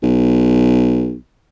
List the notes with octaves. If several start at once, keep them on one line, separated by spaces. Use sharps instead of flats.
B1